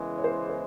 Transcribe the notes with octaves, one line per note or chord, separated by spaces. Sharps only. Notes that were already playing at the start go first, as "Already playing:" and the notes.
Already playing: E2 C#3 E3 G#3 A#4
C#5
C5
C5